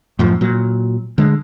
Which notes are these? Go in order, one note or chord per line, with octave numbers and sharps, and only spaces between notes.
F#2 A2 F3
A#2 F#3
D3 G#3